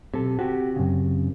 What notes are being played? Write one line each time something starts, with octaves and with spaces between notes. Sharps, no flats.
B1 C3 A4
C3 F#4 G4
F#2 C#3